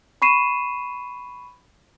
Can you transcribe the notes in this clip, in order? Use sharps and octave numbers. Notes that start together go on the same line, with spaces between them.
B5 C#6 C7 D#7 E7